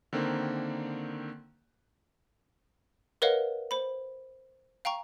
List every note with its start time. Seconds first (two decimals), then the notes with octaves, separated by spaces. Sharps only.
0.13 D3 D#3 A#3 C4
3.22 A#4 B4 C#5 D#5 F5 F#5
3.71 C5 B5
4.85 F5 G5 A#5 C#6